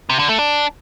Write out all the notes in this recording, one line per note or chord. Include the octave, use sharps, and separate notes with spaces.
C3
D3
A3
D4